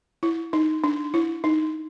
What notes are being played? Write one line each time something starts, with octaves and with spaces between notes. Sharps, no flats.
E4
D#4
D4
E4
D#4